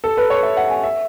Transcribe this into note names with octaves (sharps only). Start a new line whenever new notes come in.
A4
B4
C#5
E5
F#5
G#5
E5